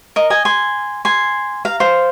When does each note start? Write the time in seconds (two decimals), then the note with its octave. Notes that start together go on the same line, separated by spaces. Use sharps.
0.16 A#4 D#5
0.30 D#5 G#5
0.45 G#5 C6
1.05 G#5 C6
1.65 F5 A#5
1.80 C5 F5